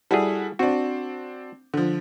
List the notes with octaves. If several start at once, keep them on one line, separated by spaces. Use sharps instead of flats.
G3 E4 F#4 G#4 A4
C4 D4 F#4
D3 F3